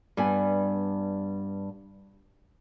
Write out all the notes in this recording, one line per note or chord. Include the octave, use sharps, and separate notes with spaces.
G2 G3 B3 G#5